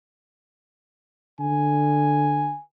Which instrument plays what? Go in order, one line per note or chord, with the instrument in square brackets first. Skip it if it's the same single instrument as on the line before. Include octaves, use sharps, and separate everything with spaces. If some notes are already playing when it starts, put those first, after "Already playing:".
[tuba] D3 [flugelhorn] G#5